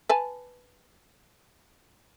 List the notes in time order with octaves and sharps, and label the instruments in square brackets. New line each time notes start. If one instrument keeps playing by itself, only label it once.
[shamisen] B4 G#5 A5